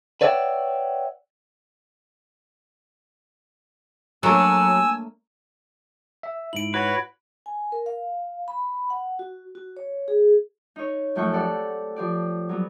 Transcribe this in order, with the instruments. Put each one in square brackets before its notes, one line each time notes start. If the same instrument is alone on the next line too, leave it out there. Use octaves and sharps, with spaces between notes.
[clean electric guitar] B4 C#5 D5 E5 F#5 G5
[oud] F#3 [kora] A3 A#3 D4 [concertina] G#5 E6
[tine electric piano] E5
[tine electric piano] G#2 E4 [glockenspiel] D7 F#7
[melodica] F#4 C#5 [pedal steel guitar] B4
[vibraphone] G#5
A#4
F5
B5
F#5
F#4
F#4
C#5
G#4
[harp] D#4 C#5
F#2 F3 A3 F#5 G5 C#6
C4 G4 A4 D5 F#5
F3 G4 D5
F#3 G3 B3